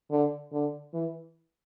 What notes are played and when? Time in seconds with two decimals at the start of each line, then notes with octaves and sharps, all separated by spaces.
0.10 D3
0.52 D3
0.94 E3